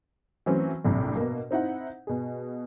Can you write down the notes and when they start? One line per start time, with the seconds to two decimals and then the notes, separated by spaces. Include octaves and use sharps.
0.46 E3 F#3 A3 C4 C#4
0.85 A#1 F#2 A2 C3
1.16 B2 A#3
1.51 C4 D#4 E4 F#5
2.07 B2 G#4